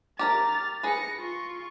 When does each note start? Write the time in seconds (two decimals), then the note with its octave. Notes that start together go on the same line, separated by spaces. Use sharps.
0.19 G4 A#4 A#5 F6 A6
0.83 G#4 B4 A#6 C#7
1.19 F4 C#6